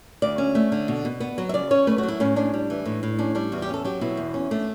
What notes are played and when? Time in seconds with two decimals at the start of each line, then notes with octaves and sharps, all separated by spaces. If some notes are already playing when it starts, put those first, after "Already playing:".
0.22 D2 D5
0.38 C#4
0.55 A3
0.72 D3
0.88 B2
1.05 B2
1.20 B3
1.38 F#3
1.49 E5
1.54 C#3 D5
1.71 C#4 C#5
1.87 A3 B4
1.98 F#4
2.03 F#3
2.08 E4
2.20 A2 C#4
2.36 C#4 D4
2.54 G3
2.70 E3
2.86 A2
3.03 A2
3.19 C#4 D4
3.35 G3 D4
3.52 E2 F#4
3.62 G4
3.69 C#4 A4
3.85 F#3 G4
4.01 B2 E4
4.17 E2
4.34 C#4
4.51 A3 D4